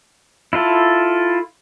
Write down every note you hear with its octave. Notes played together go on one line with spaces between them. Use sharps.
E4 F4 A4